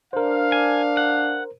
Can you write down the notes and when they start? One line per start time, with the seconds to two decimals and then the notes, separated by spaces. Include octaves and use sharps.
0.13 D4 A#4 C5 F5
0.52 G#5
0.97 F#5